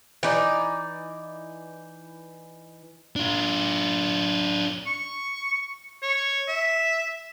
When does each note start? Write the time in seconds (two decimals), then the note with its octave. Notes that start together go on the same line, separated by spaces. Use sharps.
0.23 E3 D#4 D5
3.16 D4 F4
4.87 C#6
6.03 C#5
6.48 E5